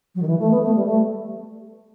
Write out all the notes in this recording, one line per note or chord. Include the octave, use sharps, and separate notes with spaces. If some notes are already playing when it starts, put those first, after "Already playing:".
F#3
D#3
E3
A3
B3
A3
G3
A3